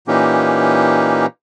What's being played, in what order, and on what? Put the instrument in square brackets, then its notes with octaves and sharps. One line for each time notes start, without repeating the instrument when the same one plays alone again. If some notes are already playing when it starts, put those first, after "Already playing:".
[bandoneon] A#2 E3 A#3 C#4 D#4 G4